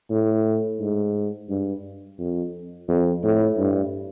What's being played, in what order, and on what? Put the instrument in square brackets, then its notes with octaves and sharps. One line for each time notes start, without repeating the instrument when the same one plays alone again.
[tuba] A2
G#2
G2
F2
F2
A2
G2